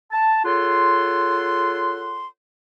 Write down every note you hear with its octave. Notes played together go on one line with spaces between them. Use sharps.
A5
F4 G#4 A4 C#5 F#5 C6